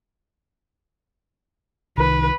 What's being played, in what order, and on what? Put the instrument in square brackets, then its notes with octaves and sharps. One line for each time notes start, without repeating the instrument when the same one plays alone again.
[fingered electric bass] C2 D#3 [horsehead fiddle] B4